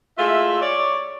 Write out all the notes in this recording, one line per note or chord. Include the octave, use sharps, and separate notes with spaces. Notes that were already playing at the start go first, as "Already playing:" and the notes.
G#3 A3 E4 F4 E5
C#5 D5